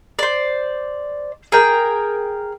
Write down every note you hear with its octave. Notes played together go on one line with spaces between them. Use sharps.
C5 D5
G#4 A#4 G5